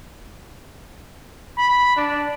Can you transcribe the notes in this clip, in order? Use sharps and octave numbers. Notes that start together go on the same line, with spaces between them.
B5
D4